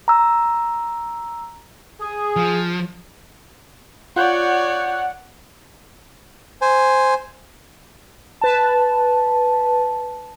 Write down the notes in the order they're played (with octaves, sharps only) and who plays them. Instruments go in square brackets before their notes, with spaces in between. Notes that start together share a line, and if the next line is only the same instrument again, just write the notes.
[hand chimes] A#5 E6
[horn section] G#4
[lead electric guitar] F3
[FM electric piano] F4 F#6 G6 [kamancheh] C#5 D5 [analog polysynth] F#5
[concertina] C5 G#5
[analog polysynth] B4 A5